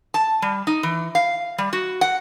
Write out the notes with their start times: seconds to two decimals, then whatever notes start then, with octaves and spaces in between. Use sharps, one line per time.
0.14 A5
0.42 G3
0.67 D#4
0.83 E3
1.15 F5
1.58 G3
1.73 F#4
2.01 F#5